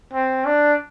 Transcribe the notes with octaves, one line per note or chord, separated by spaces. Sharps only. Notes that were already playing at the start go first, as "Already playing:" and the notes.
C4
D4